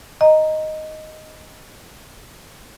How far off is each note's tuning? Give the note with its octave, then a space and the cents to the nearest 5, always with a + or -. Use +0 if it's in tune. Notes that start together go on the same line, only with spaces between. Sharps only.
D#5 +0 A#5 +0